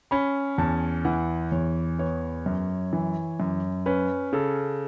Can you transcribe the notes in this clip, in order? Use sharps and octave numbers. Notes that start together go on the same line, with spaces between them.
C#4 B5
E2 A5
E3 F#5
E2 C#5
B3 C#5
F#2
E3
F#2
C#4 B4
C#3 A4